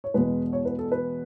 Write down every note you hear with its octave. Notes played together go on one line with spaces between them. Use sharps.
C#5
E2 B2 G#3 B4
C#5
B4
A4
B4